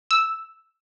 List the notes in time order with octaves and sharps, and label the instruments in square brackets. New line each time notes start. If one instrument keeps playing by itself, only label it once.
[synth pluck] E6